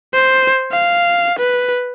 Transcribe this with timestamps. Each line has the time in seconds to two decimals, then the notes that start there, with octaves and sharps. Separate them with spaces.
0.14 C5
0.72 F5
1.39 B4